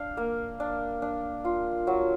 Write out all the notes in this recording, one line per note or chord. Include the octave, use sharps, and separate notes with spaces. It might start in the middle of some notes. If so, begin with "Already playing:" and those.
Already playing: D4 F5
A#3
D4
D4
F4
F#3